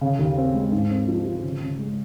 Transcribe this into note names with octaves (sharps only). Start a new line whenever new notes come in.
C#3
D#2
C4
G#3
G#2
C4
F3
F3
C#3
C#3
G#3